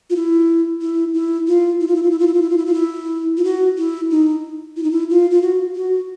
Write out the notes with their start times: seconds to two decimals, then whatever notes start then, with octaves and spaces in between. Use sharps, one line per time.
0.10 F4
0.16 E4
0.82 E4
1.14 E4
1.47 F4
1.81 E4
1.88 F4
1.96 E4
2.03 F4
2.11 E4
2.19 F4
2.27 E4
2.34 F4
2.42 E4
2.50 F4
2.58 E4
2.66 F4
2.74 E4
3.37 F4
3.44 F#4
3.78 E4
4.11 D#4
4.77 E4
4.84 D#4
4.91 E4
5.10 F4
5.31 F4
5.42 F#4
5.76 F#4